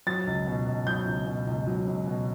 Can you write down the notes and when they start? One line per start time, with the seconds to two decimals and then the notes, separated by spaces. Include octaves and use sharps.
0.07 F#3 A6
0.27 C#2
0.47 B2
0.67 C#2
0.87 F#3 G6
1.07 C#2
1.27 B2
1.47 C#2
1.67 F#3
1.87 C#2
2.07 B2